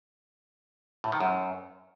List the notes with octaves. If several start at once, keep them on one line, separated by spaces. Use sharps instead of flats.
A2
D#3
F#2